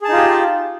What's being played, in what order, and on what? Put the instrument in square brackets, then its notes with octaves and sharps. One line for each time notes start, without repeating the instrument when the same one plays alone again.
[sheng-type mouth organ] G#4
A5
D#4
F4
G4